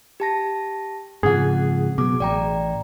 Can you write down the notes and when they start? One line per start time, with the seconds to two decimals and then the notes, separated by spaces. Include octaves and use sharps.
0.20 G4 A5 A#6
1.23 G#2 C#3 F3 C4 G#4 F#5
1.98 B2 F#3 D6
2.20 A1 D5 G5 A#5